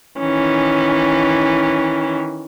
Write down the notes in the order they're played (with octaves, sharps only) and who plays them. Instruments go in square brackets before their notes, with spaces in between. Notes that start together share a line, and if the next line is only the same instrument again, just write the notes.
[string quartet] D#3 E3 C#4